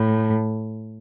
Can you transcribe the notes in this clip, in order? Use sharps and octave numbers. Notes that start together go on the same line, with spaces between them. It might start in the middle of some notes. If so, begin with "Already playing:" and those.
Already playing: A2